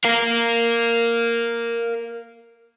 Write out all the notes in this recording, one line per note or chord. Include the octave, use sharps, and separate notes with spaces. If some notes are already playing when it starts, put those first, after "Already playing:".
A#4 F5